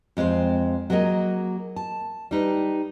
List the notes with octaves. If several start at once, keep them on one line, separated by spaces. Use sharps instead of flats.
F2 G#3 C4 C5
F#3 A#3 G#4 A#4 D#5
A5
G3 D#4 B4